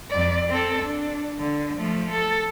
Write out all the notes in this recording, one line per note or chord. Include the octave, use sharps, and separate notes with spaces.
F2 D5
C4 A4
D4
D3
F3 A3
A4